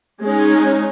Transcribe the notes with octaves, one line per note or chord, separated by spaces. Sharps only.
G#3 C#4 D#4